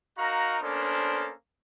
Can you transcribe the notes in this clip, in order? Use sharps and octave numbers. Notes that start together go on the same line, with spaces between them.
D#4 F#4 A#4 F5 A#5
A#3 B3 C#4 D4 A4 C5